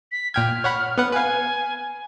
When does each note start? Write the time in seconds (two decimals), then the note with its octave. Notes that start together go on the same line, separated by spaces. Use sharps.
0.12 B6
0.34 A#2 G5 F6 G#6
0.64 C#5 F#5 B5
0.98 B3 B4 F#5
1.13 B4 F5 G#5